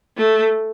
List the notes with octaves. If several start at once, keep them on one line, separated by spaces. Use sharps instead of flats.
A3